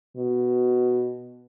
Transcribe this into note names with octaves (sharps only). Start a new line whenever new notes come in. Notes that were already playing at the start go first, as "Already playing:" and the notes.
B2